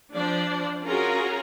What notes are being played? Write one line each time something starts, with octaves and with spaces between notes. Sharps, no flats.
F3 D4 C5 D5
C#4 F4 F#4 G#4 A#4 A#5